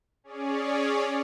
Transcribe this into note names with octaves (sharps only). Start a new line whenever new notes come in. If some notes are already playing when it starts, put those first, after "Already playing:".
C#4 G#4 C#5 D5